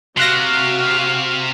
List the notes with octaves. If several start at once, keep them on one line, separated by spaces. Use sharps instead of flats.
C3 F#4 F5 C6 F#6 A#6